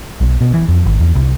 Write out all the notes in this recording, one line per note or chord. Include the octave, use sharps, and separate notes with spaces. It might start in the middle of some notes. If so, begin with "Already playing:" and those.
B1
B2
E3
F2
G#1
E2
C2